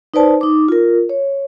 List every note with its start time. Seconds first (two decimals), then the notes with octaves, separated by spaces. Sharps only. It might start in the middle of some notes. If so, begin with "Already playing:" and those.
0.14 D#4 B4 C5 D5 A5
0.41 D#4 D6
0.68 F4 A#4
1.09 C#5